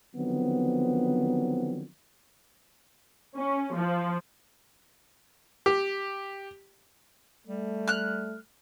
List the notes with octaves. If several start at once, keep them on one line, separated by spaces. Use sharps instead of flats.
D3 D#3 F3 F#3 B3 C4
C#4
F3
G4
G3 A3
F6 F#6